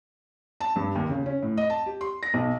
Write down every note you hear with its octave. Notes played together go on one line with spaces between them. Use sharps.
A5
G2
D#2
C#3
C#4
A2
D#5
A5
G4
C6
A#6
B1